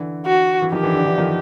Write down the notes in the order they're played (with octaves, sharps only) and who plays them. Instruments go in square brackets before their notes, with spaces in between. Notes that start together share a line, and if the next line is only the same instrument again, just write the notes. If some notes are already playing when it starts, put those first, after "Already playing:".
Already playing: [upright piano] D3 E3
[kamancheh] F#4
[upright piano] E3
[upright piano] D#3 F3 [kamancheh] G4
[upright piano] D3 E3
D3
D3 E3
D#3 F3